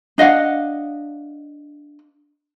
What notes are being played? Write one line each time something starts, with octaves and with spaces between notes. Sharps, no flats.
D4 D#5 F5 F#5